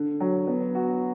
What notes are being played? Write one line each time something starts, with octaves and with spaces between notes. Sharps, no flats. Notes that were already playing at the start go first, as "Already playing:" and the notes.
Already playing: D3
F#3
B3
F#4